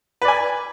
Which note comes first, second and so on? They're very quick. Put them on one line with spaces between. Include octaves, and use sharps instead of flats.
B4 D5 G#5